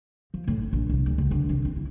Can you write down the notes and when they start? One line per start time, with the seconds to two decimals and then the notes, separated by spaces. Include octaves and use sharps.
0.34 F3
0.47 A2
0.59 G#1
0.73 A#1
0.89 C2
1.06 D2
1.18 C#2
1.31 D3
1.49 C2
1.65 C4
1.76 E4